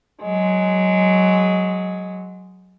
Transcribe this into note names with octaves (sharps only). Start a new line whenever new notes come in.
F#3 G#3